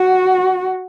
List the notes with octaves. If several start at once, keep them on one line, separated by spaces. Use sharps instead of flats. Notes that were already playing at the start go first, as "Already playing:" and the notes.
Already playing: F#4